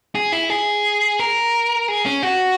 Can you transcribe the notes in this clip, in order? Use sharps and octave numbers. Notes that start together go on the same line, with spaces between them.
G#4
E4
G#4
A#4
G#4
C#4
F#4